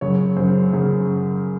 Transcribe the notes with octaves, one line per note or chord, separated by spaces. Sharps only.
F#2 C#3 C#5
F#2 C#3 C5
F#2 C#3